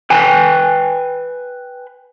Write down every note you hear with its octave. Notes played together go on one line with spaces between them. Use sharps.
B4 G5 G#5